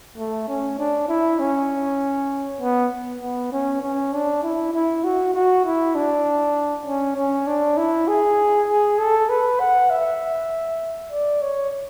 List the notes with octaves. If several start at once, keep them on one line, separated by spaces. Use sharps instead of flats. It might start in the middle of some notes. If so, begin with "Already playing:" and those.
A3
C#4
D4
E4
C#4
B3
B3
C#4
C#4
D4
E4
E4
F#4
F#4
E4
D4
C#4
C#4
D4
E4
G#4
G#4
A4
B4
F#5
E5
D5
C#5